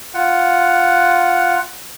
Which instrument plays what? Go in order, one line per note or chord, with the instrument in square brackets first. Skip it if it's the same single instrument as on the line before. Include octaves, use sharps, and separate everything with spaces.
[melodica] F4 F#5